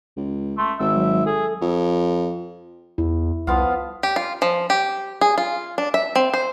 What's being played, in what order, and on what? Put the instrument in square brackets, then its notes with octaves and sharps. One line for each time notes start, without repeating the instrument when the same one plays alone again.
[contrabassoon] C#2
[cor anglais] A3 [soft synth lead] C6
[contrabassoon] G#1 [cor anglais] E5 [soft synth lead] E6
[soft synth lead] F#3
[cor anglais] G#4 [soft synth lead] A4
[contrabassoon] F2
[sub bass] E2 [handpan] E4
[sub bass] C2 [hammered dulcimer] F3 B3 F5
[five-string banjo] G4
F4
F3
G4
G#4
F4
D4
E5
C4
C5